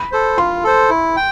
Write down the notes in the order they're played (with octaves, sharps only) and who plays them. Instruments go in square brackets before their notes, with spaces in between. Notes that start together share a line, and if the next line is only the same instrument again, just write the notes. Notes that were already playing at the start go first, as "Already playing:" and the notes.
Already playing: [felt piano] B5
[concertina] A4 C5
[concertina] F4 [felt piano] C6
[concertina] A4 C5
E4
G5